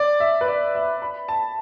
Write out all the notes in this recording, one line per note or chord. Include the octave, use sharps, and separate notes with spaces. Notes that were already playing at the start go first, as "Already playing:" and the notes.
Already playing: D5
E5
B4
D5
E5
B5
A5